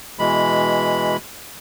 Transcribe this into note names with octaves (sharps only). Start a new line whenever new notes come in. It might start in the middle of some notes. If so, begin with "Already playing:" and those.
B2 E3 G#3 B5